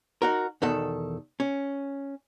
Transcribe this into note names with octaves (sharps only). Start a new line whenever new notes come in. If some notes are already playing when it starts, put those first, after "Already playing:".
D#4 F#4 A#4
E2 B2 D#3 A4
C#4